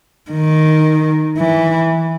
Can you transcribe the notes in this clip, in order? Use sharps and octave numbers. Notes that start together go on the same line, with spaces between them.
D#3
E3